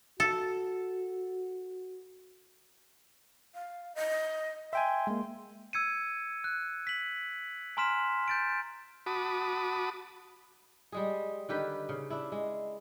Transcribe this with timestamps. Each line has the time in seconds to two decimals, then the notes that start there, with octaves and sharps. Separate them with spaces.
0.20 F#4 A4
3.54 F5
3.95 D#5
4.73 E5 G5 G#5 C6
5.07 G#3 A#3
5.73 E6 G#6 C#7 D#7
6.44 F#6
6.87 B6 F#7
7.77 G#5 A#5 C6 F6 B6 E7
8.28 G6 A6 D7
9.06 F#4 A5 B5 D6 D#6
10.92 G3 G#3 G#4
11.49 D3 D#3 G4 B4
11.89 C#3
12.10 D4 E4
12.32 G#3